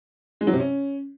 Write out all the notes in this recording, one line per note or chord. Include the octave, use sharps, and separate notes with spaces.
G#3
F#3
C3
C#4